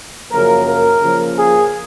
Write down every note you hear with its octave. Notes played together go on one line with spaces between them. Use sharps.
F#2 C#3 F3 A#3 A#4
A#4
C#3 F3 A#3
G#4